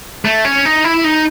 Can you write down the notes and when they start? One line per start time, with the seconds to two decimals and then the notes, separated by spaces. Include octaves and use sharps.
0.25 A3
0.45 C#4
0.65 D#4
0.84 E4
1.04 D#4